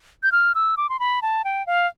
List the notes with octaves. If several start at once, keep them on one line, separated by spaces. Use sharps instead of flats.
G6
F6
E6
D6
C6
B5
A5
G5
F5